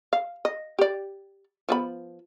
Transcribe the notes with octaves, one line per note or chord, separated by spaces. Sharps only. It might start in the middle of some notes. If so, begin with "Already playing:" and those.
F5
D#5
G4 D5
F3 B3 B5